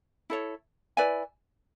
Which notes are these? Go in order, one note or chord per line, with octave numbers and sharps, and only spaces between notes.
E4 A4 C#5
E4 B4 D5 G#5